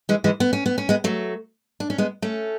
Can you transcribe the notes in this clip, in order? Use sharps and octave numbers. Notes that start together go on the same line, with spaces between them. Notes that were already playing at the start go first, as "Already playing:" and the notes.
E3 G#3
E3 G#3
B3
C#4
B3
C#4
G#3 B3
F#3 A3
D4
C#4
G#3 B3
A3 C#4